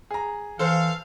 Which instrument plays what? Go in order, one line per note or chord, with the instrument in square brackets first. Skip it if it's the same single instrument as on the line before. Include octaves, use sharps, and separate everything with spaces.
[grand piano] G#4 A#5
[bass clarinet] E3 [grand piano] A4 C5 [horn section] F5